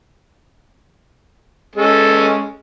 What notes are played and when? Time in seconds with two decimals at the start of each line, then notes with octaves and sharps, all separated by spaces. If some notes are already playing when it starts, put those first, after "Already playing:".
1.75 G#3 C#4 A4